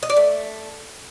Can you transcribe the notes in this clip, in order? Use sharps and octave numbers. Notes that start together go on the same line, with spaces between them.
D#5
D5
A3